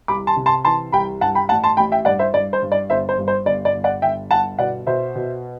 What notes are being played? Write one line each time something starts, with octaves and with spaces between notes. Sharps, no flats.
C2 B5 D6
A5 C6
C3
A5 C6
E3 A5 C6
C2 G5 B5
G2 F#5 A5
G5 B5
A1 F#5 A5
A5 C6
A1 G5 B5
E5 G5
G2 D5 F#5
C5 E5
G2 D5
C5
G2
D5
G1 C5 E5
C5
G2
C5
G1 D5
D5
G1
D5 F#5
G1 E5 G5
G1 F#5 A5
B2 D5 F#5
B2 C5 E5
B2